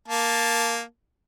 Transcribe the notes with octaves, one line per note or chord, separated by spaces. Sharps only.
A#3 A5